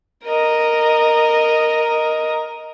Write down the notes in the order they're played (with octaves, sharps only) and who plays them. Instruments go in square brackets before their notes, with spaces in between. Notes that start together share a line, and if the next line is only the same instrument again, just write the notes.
[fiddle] A#4 D#5